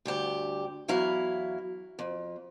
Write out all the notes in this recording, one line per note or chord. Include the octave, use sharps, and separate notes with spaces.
D2 G2 G4
E2 F#3 E4 F5
F2